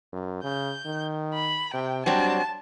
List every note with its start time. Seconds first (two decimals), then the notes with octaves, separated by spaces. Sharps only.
0.13 F#2
0.44 C#3 G6
0.86 D#3
1.34 B5
1.74 C3 G5
2.06 F#3 G3 C4 D4 A5